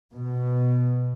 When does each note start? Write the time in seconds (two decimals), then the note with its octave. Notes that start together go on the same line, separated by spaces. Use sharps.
0.13 B2